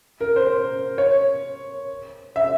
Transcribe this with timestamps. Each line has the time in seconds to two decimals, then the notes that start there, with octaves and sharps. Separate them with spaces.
0.21 A#4
0.36 C5
0.98 C#5
2.36 E5